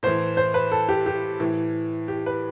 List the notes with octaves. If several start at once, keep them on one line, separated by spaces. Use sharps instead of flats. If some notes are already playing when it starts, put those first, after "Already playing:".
A2 E3 C5
C5
B4
A4
G4
G4
A2 E3
G4
B4